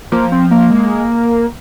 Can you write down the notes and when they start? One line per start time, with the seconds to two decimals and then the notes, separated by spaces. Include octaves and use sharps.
0.12 F3 A#3
0.32 C4
0.51 A#3
0.71 G#3